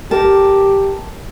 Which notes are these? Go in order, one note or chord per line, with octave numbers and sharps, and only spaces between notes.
G4 A#4 A5